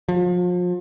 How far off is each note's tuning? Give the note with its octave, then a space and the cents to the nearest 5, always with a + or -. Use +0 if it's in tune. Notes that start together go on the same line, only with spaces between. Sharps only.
F3 +35